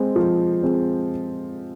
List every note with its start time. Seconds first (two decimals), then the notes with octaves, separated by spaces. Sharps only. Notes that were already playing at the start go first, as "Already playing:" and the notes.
Already playing: G#3 C4
0.16 F3
0.63 G#3 C4